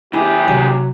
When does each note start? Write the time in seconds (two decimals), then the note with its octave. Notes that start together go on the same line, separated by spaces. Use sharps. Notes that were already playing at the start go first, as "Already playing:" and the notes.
0.13 D#2 E4 G4 G#4
0.48 C3 F#3